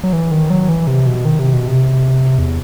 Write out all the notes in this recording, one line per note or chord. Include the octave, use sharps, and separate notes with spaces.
F#3
E3
D#3
F#3
E3
C3
B2
D#3
C3
B2
C3
E2